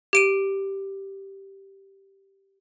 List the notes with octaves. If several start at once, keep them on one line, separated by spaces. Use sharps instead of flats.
G4 D7 D#7